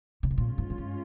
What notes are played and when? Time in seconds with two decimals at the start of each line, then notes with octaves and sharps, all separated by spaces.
0.23 C#3
0.31 C3
0.37 A#2 G#3 C#4 F4
0.58 G#2
0.70 G#2
0.78 G2